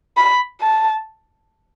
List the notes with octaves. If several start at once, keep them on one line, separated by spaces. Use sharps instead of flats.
B5
A5